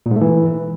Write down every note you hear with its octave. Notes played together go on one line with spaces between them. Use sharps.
A#2
G#2
A3
E3